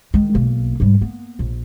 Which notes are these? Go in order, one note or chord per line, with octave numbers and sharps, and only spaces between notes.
D#3 G#3
B1 A#3
G#2 G3
A#3 B3
A#1